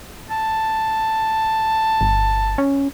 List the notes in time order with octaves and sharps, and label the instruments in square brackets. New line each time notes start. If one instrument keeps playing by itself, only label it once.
[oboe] A5
[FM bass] G1
C#4